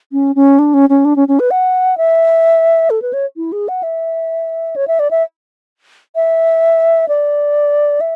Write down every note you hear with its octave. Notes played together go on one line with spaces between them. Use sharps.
C#4
C#4
D4
C#4
C#4
D4
C#4
C#4
B4
F#5
E5
A4
B4
C#5
E4
G#4
F#5
E5
C#5
E5
D5
E5
E5
D5
E5